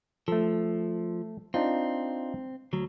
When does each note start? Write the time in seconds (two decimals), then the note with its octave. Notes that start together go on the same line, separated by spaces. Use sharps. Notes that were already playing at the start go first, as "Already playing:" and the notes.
0.28 F3 A3 A4
1.54 C4 D4 D#4 F4
2.73 D2 F#3